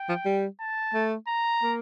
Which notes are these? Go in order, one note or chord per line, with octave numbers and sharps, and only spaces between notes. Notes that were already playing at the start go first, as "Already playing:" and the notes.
Already playing: G5
F3
G3
A5
A3
A#5
A#3